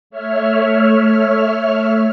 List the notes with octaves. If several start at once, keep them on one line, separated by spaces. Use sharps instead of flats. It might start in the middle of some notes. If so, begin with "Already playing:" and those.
A3 C#5 E5 F6